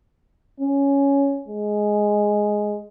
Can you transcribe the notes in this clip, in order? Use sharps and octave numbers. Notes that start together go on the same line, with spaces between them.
C#4
G#3